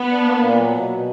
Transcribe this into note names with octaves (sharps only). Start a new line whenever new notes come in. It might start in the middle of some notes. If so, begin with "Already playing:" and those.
Already playing: B3
D4
A#3
A#2
F#3
B2
B2